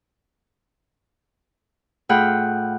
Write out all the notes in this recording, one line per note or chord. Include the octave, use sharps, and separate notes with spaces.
A2 F4 G#4 F#5 G5 B5